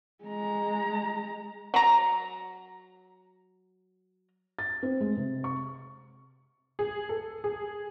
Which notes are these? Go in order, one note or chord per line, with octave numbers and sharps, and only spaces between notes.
G#3 A#5
F#3 A#5
A6
C4
G#3
C3
C#6
G#4
A4
G#4